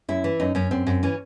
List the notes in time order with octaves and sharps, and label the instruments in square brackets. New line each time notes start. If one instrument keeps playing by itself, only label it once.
[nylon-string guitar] F#2 E4
E3
F#2 D#4
F#2 C#4
F#2 C4
F#2
E3 C#4